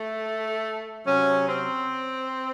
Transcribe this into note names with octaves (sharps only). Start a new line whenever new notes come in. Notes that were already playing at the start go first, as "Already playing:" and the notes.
Already playing: A3
C3 F#3 C#4
C4